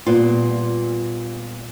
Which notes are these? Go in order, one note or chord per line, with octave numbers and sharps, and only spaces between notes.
A#2 G3 B3 F4